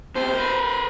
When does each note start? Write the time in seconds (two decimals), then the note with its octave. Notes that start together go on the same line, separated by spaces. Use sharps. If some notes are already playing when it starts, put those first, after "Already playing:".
0.15 B2 C4 C5
0.34 A#4 B4